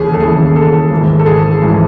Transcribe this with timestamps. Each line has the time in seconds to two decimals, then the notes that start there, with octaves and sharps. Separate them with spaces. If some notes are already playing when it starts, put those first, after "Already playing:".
Already playing: D#2 C#3 E3 G#4
0.13 A4
0.20 D#2 C#3 E3 G#4
0.56 A4
0.90 G#1 G#2 E3
1.19 A4
1.26 G#4
1.62 G#1 G#2 E3